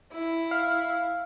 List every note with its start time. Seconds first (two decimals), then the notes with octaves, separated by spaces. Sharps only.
0.13 E4
0.51 F5